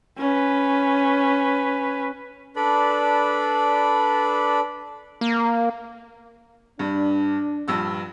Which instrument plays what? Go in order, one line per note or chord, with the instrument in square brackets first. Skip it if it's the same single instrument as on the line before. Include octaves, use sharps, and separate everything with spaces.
[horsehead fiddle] C#4 B4
[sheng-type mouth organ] D4 A4 B4 D5 B5
[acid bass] A#3
[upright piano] G2 [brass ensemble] D4
[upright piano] A#1 G2 E6